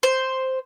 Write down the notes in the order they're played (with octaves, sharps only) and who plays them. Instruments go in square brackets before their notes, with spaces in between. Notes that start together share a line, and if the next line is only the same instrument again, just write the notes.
[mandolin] C5